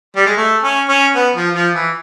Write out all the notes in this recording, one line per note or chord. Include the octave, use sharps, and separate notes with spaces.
G3
G#3
A3
C#4
C#4
B3
F3
F3
E3